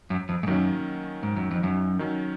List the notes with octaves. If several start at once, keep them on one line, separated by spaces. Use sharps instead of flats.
F#2
F2
G#2
F#2 D#3 F#3 A#3 C#4
G#2
F#2
F2
F#2
D#3 F#3 C#4